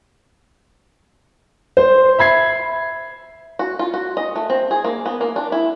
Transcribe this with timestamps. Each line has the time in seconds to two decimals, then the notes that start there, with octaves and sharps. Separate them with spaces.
1.77 C5
2.18 E5 B5 G#6 C7
3.59 F#4
3.79 F4
3.94 F#4
4.17 D#5
4.36 A3
4.50 C4
4.71 G#4
4.84 A#3
5.06 B3
5.21 A#3
5.36 D4
5.52 E4